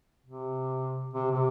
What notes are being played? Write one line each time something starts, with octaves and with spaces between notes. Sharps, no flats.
C3
C3
C3